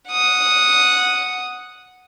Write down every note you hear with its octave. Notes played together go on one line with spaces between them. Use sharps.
F#5 D#6